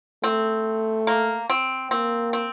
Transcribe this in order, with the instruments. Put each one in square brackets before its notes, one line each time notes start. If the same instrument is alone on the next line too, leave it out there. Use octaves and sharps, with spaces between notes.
[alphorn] A3 [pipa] C4
[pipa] A#3
C4
[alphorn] A#3 [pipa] C4
[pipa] C4